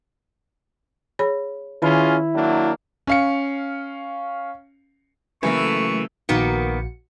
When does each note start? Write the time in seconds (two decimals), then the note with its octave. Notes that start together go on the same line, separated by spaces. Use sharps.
1.19 G#4 C#5 B5
1.82 D#3 C#4 E4 F4 G#4 B5
2.34 F#3 A#3 D4
3.07 C#4 F5 C#7
5.43 C#3 E3 F#3 A3 A#3 C#6
6.29 A#1 D#3 A#3 B3 F#4 C#7